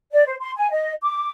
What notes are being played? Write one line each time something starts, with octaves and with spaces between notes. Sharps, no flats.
D5
C5
C6
G#5
D#5
D6